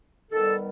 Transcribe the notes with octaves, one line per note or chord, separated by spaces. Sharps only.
D#3 G3 B3 A4